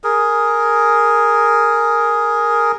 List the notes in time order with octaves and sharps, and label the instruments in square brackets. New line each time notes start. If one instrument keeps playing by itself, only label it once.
[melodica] G#4 A#4